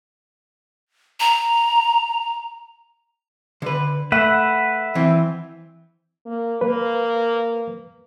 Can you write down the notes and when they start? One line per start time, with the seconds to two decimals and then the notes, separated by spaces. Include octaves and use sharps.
1.20 A#5
3.62 D3 B4
4.12 A3 B4 E5 F#5
4.95 E3 C4
6.26 A#3
6.61 A#3 B4